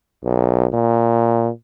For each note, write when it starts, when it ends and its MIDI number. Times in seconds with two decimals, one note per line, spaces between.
0.24 0.66 35
0.73 1.49 46